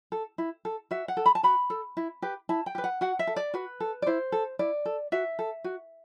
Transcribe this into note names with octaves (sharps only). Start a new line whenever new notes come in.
A4
E4
A4
F#4 E5
F#5
A4
B5
A5
F#4 B5
A4
E4
G4 B4
E4 A5
G5
G4 B4
F#5
F#4 F#5
E5
A4
D5
F#4 B4
A4
D5
E4 C5
A4
E4 D5
A4
F#4 E5
A4
F#4